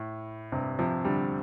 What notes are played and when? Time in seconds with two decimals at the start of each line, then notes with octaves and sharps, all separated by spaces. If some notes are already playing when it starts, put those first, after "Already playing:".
Already playing: A2
0.52 G2 C3
0.79 C3 F3
1.05 D3 G3